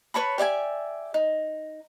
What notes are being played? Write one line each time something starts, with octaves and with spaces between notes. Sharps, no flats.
B4 C#5 A5 B5
G4 D5 E5 G#5
D#4